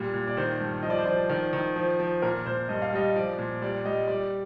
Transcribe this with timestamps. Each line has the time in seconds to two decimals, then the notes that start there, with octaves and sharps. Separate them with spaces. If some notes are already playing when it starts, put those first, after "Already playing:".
Already playing: A#2 G3
0.13 A#2
0.27 D5
0.37 D#3 C5
0.61 G2
0.83 F3 D#5
0.90 D5
0.98 C5
1.06 F3 D5
1.29 D#3 D5
1.53 D#3
1.76 F3
2.00 F3
2.22 A#2 A#4
2.46 A#2 C5
2.69 G2 D#5
2.82 F5
2.93 G3 D#5
3.16 F3 D5
3.38 A#2
3.62 G3 D5
3.85 G3 D#5
4.08 G3 D5